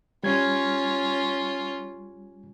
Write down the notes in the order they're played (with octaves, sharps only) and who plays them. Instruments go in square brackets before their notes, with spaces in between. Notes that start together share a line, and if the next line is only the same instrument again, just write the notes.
[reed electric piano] G3 G#6 [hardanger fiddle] C#4 F4